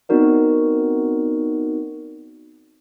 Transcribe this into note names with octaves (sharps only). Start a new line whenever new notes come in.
B3 C4 D#4 F#4 A#4 D5